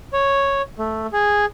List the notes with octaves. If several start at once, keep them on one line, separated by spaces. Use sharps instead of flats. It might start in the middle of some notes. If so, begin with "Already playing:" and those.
C#5
A3
G#4